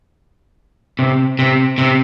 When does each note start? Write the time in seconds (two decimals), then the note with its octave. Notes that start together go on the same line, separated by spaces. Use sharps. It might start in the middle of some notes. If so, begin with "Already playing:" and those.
0.99 C3
1.39 C3
1.78 C3